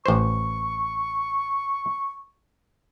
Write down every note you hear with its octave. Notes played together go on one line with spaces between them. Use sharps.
A1 C5 C#6